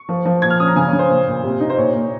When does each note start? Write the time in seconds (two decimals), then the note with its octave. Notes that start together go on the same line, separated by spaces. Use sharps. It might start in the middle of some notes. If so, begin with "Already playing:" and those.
Already playing: C#6
0.09 F3
0.25 F3
0.42 A#2 G#6
0.50 F6
0.60 C#4 D#6
0.68 A#5
0.76 C#3 G#5
0.88 C#5
0.93 C#3
0.99 C5
1.10 A#2
1.27 A#2
1.43 C3
1.60 D#4
1.70 C5
1.78 A#2 C#5
1.94 A#2